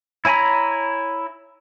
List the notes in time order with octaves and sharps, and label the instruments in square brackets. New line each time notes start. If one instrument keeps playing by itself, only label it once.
[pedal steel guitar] E4 C#5 G#5 A#5 B5